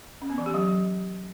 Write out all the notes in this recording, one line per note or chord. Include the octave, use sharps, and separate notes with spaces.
C#4
B3
E3
G4
F#3